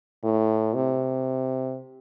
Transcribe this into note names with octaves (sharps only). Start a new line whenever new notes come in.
A2
C3